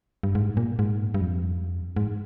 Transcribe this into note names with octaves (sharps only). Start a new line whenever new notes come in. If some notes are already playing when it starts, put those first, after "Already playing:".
G2
G#2
A#2
G#2
G2
F2
G#2